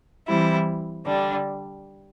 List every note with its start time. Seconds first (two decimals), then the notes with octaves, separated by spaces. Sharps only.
0.27 E3 G3 C4 E4
1.05 D3 G3 D4